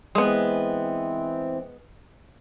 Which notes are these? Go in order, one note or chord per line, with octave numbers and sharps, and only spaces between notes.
E3 G#3 B3 C4